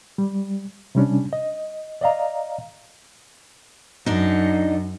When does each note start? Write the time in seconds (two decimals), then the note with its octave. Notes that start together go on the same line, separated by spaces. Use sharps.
0.18 G3
0.95 C3 G3 C#4 D4
1.33 D#5
2.01 D5 D#5 F5 A#5
4.06 F#2 D4 D#4